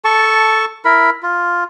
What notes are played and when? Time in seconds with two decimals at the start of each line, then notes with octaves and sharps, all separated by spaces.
0.05 A4 A5 C#6
0.85 E4 A#4 B5
1.23 F4